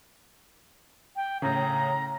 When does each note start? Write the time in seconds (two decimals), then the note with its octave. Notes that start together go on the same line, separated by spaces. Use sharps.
1.16 G5
1.42 A2 C#3 A#5